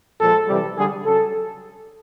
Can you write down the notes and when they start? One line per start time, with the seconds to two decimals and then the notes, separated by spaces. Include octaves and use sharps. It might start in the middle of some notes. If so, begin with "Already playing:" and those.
0.20 A#2 F3 G#3 A4
0.48 C3 E3 G3
0.77 D3 G3 G#4
1.05 C#3 F#3 A4